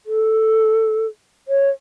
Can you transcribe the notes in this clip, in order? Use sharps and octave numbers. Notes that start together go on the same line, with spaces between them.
A4
C#5